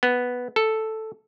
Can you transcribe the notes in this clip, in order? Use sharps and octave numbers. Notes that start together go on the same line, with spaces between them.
B3
A4